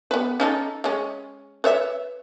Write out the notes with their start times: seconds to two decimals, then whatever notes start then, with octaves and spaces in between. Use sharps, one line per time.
0.11 B3 B4
0.40 C#4 D#4 A4
0.84 G#3 C#4
1.64 B4 C#5 E5